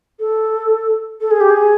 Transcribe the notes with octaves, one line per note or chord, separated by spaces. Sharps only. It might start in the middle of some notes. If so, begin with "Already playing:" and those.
A4
A4
G#4
G4
G#4